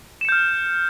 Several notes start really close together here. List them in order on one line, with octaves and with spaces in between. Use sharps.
E7 C#7 G6 F6